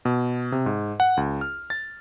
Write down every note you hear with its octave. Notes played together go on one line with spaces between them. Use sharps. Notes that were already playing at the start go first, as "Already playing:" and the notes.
B2
C3
G#2
F#5
C#2
F6
A6